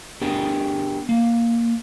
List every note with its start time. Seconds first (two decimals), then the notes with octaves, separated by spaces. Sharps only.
0.22 B3 D4 G4 G#4 A#4
1.09 A#3